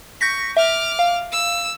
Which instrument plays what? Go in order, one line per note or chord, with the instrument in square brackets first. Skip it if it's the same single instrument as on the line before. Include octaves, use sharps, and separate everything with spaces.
[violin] C#6 [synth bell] G6 A#6 B6
[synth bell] E5 [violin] D6 F6
[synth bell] F5
[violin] E6